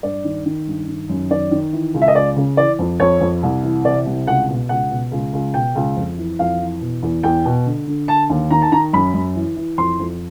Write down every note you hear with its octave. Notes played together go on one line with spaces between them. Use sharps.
G2 D5
D#3
D#3
G2
D#3
F#2
D#3 D5
D#3
E3
C#2
E5
D#5
C#2 D5
C#3
E3 D5
F2
F2 C#5
F2
C2
E3
C3 D5
C2
C#2 F#5
B2
C#2 F#5
B2
C#2
C#2
B2 G5
C#2
F2
E3
F2 F5
E3
B2
E2
E2 G5
B2
D3
D3
D3 A5
D#2
D#3 A#5
A5
D#3 A#5
F#2 B5
F#2
E3
E3
F2 C6
F2